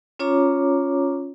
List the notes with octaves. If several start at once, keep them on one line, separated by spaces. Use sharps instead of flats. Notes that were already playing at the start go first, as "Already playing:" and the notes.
C#4 F4 C#5 A#5 D6